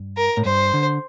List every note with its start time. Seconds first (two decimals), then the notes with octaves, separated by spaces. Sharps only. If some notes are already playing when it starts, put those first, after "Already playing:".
Already playing: G2
0.17 A#4
0.37 A2
0.45 G2 C5
0.74 D3